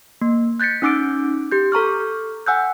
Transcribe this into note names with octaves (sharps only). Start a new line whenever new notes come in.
A#3
F#6 G6 A6 B6 C#7
C#4 D#4 D6 E6 D7
G4 G6
A4 A#5 C#6 F6
F#5 G#5 E6 F#6 G6